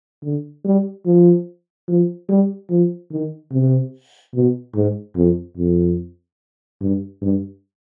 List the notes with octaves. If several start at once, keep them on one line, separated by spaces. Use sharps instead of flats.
D3
G3
F3
F3
G3
F3
D#3
C3
B2
G#2
F2
F2
G2
G2